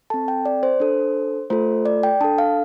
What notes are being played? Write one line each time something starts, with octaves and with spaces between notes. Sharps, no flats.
C4 A4 A5
G5
D5
C5
D4 A4
A3 F4 A4 C5
D5
G5
D4 A4 A5
F5